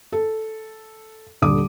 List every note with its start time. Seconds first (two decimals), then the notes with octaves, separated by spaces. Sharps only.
0.12 A4
1.42 D#1 D3 G3 D6 D#6